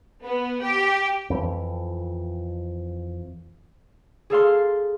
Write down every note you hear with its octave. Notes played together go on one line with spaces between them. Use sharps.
B3
G4
F2 E3
G#4 A4 F5 C6